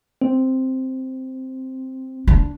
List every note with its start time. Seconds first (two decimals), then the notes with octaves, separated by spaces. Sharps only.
0.22 C4
2.27 D4